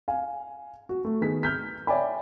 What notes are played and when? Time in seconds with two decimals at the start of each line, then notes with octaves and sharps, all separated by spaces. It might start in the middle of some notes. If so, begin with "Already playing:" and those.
0.08 F5 G#5
0.89 F#4
1.05 A3
1.21 D#3 B3 G#4 B6
1.43 F6 G6 B6
1.87 C#5 D5 E5 G5 G#5 B5